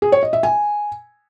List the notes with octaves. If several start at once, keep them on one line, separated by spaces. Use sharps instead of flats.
G#4
C#5
D#5
E5
G#5